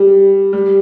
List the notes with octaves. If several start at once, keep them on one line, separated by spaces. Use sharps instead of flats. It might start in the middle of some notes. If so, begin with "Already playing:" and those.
Already playing: G3
G3